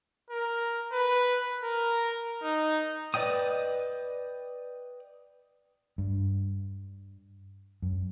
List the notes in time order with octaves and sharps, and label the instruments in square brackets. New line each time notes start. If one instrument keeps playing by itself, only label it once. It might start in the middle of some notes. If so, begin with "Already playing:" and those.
[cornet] A#4
B4
A#4
D#4
[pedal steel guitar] B4 D5 D#5 G5 D#6
[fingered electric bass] G2
F#2